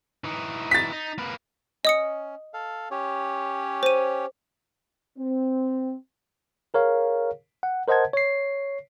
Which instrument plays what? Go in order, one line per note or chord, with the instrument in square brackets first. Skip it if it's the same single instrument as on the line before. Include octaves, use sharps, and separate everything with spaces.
[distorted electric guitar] E3 D#4
[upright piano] A6 B6
[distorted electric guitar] D#4
A#3 B4
[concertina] C#4 [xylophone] D#5 D#6 C#7
[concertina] A4 F5
C#4 G4 C#5
[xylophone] C5 D#7
[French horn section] C4
[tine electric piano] G#4 A#4 C#5 F5
F#5
A#4 C5 D#5 F#5 A5 G#6
C#5 C7